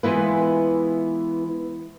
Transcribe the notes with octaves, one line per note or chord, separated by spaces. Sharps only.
E3 G#3 B3 E4 F4 B4